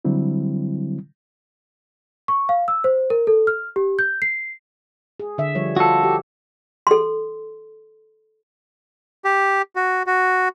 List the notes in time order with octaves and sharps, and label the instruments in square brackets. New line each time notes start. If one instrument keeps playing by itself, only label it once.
[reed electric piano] D3 F#3 G3 C4 E4
[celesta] C#6
F5
E6
C5
A#4
A4
F6
G4
G6
C7
[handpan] G#4
D3 E5
F3 G3 C#5
[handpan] F4 [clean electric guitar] F#4 A4
[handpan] G4
[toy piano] A4 C6
[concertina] G4
F#4
F#4